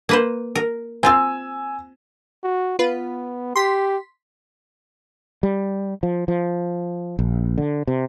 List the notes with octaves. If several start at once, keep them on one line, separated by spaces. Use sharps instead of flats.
A#3 B4 C5
A#4
C4 F4 F5 G#5 E6
F#4
B3 F4 B4
G4 C6 B6
G3
F3
F3
A#1
D3
C3